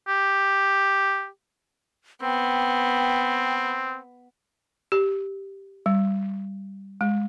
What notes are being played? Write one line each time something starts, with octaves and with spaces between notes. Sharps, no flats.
G4
B3 C4 G5
G4
G3
G#3